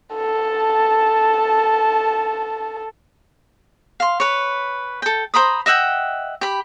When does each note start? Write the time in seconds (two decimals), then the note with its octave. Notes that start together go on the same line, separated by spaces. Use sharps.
0.14 A4 A5
4.00 F5 C6
4.20 B4 C#5
5.02 A4 G5
5.34 C5 A#5 B5 D#6
5.66 D#5 E5 F#5 G5
6.41 G4 B5